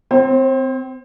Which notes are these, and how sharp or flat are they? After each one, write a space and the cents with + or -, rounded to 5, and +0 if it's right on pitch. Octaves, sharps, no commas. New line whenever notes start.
C4 -20 C5 +35